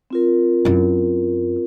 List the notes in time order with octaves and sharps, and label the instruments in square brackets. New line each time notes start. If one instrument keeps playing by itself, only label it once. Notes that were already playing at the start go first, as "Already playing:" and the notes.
[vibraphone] C4 F4 A#4
[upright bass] F#2 E4